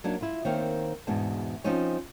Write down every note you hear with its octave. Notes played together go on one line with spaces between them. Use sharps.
F#3 A#3 D4 D#4
E4 F4
D#3 A#3 C4 C#5 F5
E2 G#2 B2 D4 A5
F3 C4 C#4 D#4 C#5